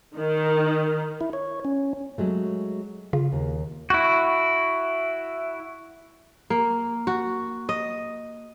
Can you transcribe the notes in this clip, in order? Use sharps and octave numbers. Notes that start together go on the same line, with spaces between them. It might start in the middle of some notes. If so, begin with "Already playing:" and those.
D#3
E4
C#5
C#4
F#3 G#3 A3
C#3 F4
D#2 A#3
E4 F#4
A#3
F#4
D#5